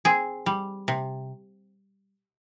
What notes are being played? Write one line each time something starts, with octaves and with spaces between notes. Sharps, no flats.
C4 G#4
G3
C3